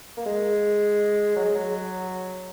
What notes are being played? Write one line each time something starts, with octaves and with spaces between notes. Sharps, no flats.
A#3
G#3
F#3
G#3
F#3